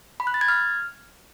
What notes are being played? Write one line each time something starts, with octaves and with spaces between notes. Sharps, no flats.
B5
F#6
A6
G#6
F6